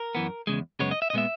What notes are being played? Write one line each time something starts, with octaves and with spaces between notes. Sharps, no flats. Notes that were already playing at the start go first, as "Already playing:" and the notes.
Already playing: A#4
F#2 E3 B3
E2 C#3 G#3
F#2 C#3 G#3 B3 C#5
D#5
E5
D#5
A#2 G#3 B3 E5